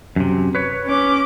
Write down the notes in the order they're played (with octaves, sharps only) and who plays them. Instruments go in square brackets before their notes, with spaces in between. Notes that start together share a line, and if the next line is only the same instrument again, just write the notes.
[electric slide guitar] F#2 C3
B4 C#5
[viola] C#4 D6